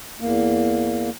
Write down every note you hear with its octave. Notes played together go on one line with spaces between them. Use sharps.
E2 A#3